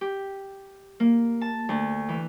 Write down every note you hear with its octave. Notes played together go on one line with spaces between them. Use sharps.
G4
A#3
A5
D2
E3